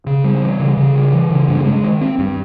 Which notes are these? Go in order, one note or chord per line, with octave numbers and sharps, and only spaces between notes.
C#3
G3
E3
C#3
C#3
G3
E3
C#3
G2
G#3
D#3
C4
G2